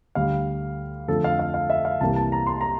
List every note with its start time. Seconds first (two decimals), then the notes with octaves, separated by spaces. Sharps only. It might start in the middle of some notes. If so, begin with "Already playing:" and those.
0.15 D2 D3 G3 F5
1.08 F2 D3 F3 A3 A4
1.24 F5
1.39 F5
1.54 F5
1.70 E5
1.85 F5
2.01 C2 C3 E3 A#3 A5
2.16 A5
2.32 A#5
2.47 C6
2.61 A#5